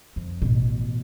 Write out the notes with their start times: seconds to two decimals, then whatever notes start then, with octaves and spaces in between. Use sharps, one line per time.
0.16 F2
0.42 A1 B2